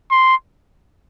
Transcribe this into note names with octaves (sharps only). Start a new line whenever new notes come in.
C6